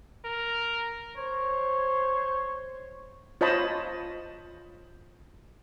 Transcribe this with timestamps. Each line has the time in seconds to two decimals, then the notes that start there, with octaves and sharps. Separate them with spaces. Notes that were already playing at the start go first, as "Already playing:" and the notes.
0.25 A#4
1.16 C5 C#5
3.41 F4 C5 C#5 D#5 A5 B5